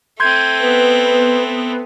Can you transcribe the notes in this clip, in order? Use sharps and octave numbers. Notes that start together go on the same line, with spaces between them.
A3 C4 C6 G6 G#6 D#7
B3 B4